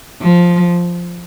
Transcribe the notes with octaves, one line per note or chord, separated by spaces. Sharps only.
F3